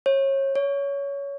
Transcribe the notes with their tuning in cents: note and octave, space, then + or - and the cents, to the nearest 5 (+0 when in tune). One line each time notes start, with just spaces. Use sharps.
C#5 -30
C#5 +20